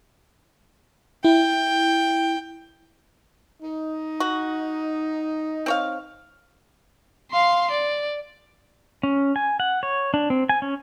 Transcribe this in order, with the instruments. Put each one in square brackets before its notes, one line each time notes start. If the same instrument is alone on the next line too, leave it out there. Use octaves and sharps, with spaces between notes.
[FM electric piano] E4 [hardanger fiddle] G5
[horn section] D#4
[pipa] F#4
C4 C#5 F5
[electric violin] F5 C6
D5
[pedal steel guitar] C#4
G#5
F#5
C#5
D4
C4
G#5
C#4